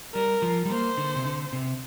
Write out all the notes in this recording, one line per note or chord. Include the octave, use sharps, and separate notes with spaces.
G3 A#4
F3
G3
A#3 C5
D3
C3
D3
C3